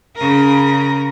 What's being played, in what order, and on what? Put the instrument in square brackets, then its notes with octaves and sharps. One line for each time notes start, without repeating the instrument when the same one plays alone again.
[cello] C#3 A#4